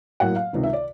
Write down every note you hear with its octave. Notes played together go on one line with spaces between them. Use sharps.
A2 F#3 A#3 F#5
F5
C#2 C3 D#3
E5
D5